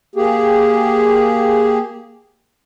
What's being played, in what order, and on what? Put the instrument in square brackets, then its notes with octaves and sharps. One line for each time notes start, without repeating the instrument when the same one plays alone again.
[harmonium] A#3 G4 G#4